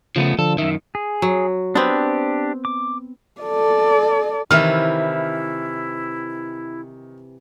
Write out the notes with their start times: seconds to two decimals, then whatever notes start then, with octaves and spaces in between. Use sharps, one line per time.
0.16 C#3 F3 A3 B3
0.39 D3 F3 A4
0.58 F#2 D#3 E5
0.95 G#4
1.22 F#3
1.75 B3 C4 D4 G4
2.65 D6
3.42 A4 D5
4.51 C3 D#3 E3 E4 E5 F6